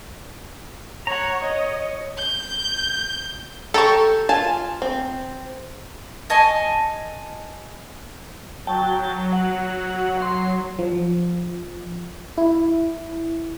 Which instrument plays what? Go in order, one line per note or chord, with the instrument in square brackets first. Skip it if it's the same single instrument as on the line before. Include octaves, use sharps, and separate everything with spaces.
[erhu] C#5 [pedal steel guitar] F#5 A#5
[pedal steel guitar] C#5 [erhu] D#5
[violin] G6
[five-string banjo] G4 [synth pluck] A4 A#5 C#6
[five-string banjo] F4 G#5 [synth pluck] A5
[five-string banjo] C4
[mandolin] D#5 G#5 A5 C#6
[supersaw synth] F#3 [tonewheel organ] G5 A5
[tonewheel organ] F#5
C6
[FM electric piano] F3
E4